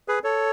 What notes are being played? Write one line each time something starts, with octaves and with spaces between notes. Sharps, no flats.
G#4 B4
A4 C#5